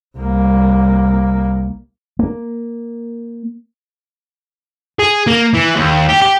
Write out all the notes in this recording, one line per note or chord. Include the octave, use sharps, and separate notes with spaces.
C2 A#3
A#3
G#4
A#3
E3
D#2
G4
G4